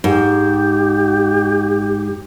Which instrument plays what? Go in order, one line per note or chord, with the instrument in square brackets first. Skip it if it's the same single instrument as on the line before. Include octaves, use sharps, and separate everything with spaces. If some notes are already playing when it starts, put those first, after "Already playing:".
[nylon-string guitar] G#2 [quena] G4